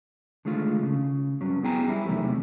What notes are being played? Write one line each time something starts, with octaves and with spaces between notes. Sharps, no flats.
D3 D#3 G#3 A3 F4
C#3
G2 F#3 C#4
B3 E4 G#4 G5 G#5 A#5
G3 E4
E2 C3 D#3 F#3 A3